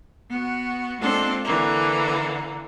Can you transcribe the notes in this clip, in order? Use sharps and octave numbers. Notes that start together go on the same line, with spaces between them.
B3 F#4
G#3 A#3 C4 D4 F4 A4
D3 E3 A#3